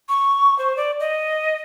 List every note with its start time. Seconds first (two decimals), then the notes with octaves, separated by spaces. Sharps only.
0.09 C#6
0.58 C5
0.77 D5
1.00 D#5